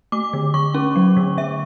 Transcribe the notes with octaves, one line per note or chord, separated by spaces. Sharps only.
A3 D6
D3
D3 C#6
C#4
F#3
D3
D3 E5